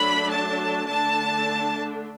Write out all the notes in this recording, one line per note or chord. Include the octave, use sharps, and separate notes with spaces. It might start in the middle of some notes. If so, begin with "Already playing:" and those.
Already playing: F#3 A3 D4 B5
A5
D3 A3 D4 A5